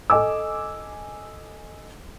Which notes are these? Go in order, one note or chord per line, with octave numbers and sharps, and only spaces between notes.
A4 D#5 G#5 D6 E6